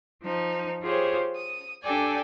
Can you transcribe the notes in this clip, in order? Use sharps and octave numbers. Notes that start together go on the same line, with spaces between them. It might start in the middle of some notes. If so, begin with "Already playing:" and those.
F3 D#4
F4 G4 G#4 C5 C#5
D#6
D4 G4 A4 D5 G5 G#5